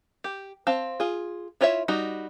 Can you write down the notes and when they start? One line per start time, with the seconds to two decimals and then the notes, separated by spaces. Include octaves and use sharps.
0.24 G4
0.67 C4 F5 A5
1.00 F4 G#4
1.61 E4 F4 C#5 D#5 E5
1.88 G3 D#4 F#4